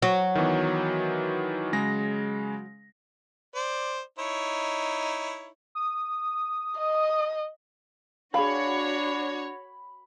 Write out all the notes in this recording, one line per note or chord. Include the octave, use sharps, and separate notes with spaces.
F#3
D#3 E3 B3
C#3 G#3 A#6
C5 D5
D#4 E4 C#5
D#6
D#5
D4 F#4 G#4 C#5 F5 B5